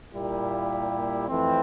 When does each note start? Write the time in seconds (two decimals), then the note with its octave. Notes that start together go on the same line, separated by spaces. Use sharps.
0.12 A#2 G3 A#3 E4 G4
1.28 F2 E3 A3 C4